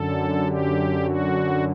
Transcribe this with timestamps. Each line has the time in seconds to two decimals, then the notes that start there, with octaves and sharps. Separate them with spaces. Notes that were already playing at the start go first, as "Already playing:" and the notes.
Already playing: F#2 D3 A4
0.46 G4
1.04 F#4